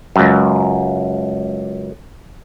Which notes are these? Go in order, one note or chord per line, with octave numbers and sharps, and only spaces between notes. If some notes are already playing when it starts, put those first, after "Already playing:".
C#2 F#2